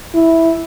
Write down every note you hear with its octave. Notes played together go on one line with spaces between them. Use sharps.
E4